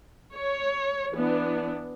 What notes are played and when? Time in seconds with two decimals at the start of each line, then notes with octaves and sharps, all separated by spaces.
0.35 C#5
1.12 E3 B3 D4